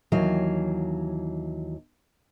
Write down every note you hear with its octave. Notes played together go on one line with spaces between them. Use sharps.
D#2 E3 F#3 F5